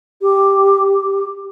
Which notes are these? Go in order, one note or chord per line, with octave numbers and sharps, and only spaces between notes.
G4